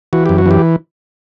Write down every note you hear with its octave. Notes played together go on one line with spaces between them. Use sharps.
E3 F#4
F#2 G4
F#4
E3 G4